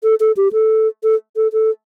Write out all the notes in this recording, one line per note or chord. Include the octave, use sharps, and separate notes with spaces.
A4
A4
G4
A4
A4
A4
A4